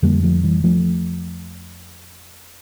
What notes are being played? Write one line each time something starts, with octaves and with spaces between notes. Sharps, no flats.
F2 D3 G3 A#3
F3 A3
E3 G3
F3 A3